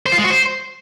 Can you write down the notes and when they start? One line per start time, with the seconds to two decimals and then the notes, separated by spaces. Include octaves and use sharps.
0.06 C5
0.12 F4
0.18 G#3
0.24 F#4
0.30 C5